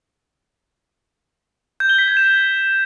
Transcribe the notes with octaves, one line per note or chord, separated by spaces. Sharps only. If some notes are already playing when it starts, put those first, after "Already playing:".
G6
G7
B6
G#6
E7